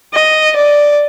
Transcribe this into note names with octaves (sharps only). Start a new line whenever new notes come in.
D#5
D5